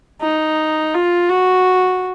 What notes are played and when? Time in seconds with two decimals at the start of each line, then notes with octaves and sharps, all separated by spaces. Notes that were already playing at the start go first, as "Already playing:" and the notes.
0.21 D#4
0.94 F4
1.30 F#4